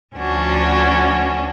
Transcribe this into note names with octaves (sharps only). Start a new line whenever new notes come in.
D2 F3 C#4 D4 F#4